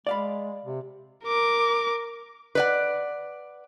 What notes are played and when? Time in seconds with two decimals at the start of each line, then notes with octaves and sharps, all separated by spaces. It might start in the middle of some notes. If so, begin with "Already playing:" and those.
0.07 G#3 D5 F5 B5
0.65 C3
1.25 A#4 D6
2.55 B4 D5 F#5